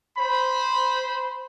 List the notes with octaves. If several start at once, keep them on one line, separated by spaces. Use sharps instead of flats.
C5 B5